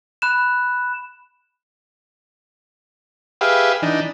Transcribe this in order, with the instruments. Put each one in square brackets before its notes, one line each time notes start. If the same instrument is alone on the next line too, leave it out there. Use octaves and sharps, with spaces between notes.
[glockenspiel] B5 F#6 E7
[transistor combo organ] G4 G#4 B4 E5 F5
E3 D4 D#4